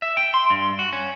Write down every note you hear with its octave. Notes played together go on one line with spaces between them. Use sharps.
E5
G5
C6
G2
F#4
C#4